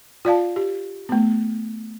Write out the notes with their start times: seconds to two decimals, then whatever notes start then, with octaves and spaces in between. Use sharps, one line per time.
0.25 F4 D5 F5 A5
0.56 G4
1.09 A3 B3